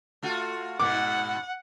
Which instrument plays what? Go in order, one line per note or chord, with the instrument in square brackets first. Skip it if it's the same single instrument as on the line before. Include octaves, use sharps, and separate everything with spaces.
[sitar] A3 F4 F#4
[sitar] G#2 B2 [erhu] F#5 [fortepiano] D6